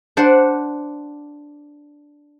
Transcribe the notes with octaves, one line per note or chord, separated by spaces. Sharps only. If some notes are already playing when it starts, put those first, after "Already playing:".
D4 C5 D5 F#5